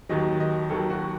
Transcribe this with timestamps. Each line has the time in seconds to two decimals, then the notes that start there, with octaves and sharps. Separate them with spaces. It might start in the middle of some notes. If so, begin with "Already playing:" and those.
0.09 D#2 D#3 F#3 D#5
0.40 D#5
0.70 D#2 D#3 F#3 A4
0.90 F#4